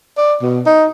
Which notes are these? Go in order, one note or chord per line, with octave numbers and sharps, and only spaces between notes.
D5
B2
D#4